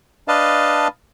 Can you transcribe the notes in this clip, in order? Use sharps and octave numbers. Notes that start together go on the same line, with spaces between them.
D4 B4 D#5 F5 A5